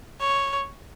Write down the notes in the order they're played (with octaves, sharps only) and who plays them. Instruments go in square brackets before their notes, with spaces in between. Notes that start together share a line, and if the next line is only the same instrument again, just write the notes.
[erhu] C#5